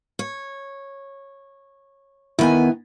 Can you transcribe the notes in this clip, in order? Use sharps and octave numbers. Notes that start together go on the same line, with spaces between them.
C#5
D#3 B3 E4 G#5